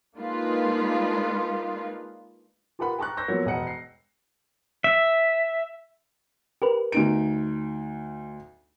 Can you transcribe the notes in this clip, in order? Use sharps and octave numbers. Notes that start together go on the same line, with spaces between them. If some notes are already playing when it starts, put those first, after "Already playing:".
G#3 A#3 D4 D#4 F4 B4
F4 G4 A#4 B4 F#5 B5
G5 A5 A#5 C#6 F#6
C#6 E6 G6 A#6
F3 F#3 A#3 B3 C#5
E1 D#5 F#5 C#7
C7
E5
G4 A#4 B4
D2 D#4 D7